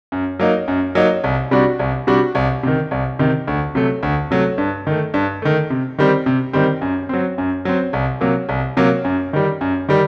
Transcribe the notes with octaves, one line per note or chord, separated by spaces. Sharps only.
F#2
F#3 A#3 D#4
F#2
F#3 A#3 D#4
C2
C3 G3 D4 F#4
C2
C3 G3 D4 F#4
C2
C3 D#3
C2
C3 D#3
D2
C3 F#3 A3
D2
C3 F#3 A3
G2
D#3 A3
G2
D#3 A3
C3
D#3 G3 C4
C3
D#3 G3 C4
F#2
F#3 C4
F#2
F#3 C4
C2
C3 F#3 A#3
C2
C3 F#3 A#3
F#2
D#3 G3
F#2
D#3 G3